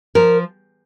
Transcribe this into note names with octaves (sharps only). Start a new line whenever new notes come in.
F3 A#4